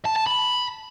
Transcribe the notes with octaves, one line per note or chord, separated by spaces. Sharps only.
A5
A5
B5